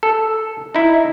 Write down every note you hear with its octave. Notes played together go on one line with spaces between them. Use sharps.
A4
D#4 E4